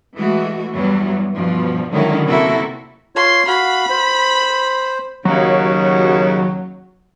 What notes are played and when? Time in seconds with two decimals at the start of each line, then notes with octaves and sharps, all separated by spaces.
0.15 E3 G#3 A3 F#4
0.74 E2 G2 E3 F#3 G3 B3
1.34 G2 B2 F3
1.91 D3 D#3 F#3 G#3 C#4 E4
2.27 F#2 C3 A#3 E4 F#4 A4
3.16 F4 C#5 C6
3.47 F#4 F5 B5
3.90 C5
5.25 D#2 C#3 F#3